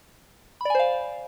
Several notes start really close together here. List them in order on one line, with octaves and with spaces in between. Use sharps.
B5 D5 G#5 C5 F5